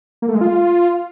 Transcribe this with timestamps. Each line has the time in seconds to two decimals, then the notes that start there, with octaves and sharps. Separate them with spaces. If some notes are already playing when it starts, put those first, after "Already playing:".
0.22 A#3
0.29 A3
0.35 G#3
0.41 F4